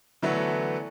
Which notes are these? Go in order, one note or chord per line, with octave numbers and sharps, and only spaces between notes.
D3 E3 F#3 A3 B3